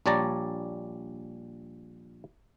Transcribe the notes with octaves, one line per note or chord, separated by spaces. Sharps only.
A#1 G3 C#5 D5 A5 A#5